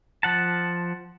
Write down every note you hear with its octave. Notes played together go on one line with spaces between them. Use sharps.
F3 F#5 A5